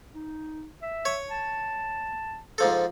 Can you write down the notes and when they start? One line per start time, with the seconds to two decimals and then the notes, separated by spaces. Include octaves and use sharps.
0.15 D#4
0.82 E5
1.05 C#5
1.31 A5
2.58 G#2 F3 A4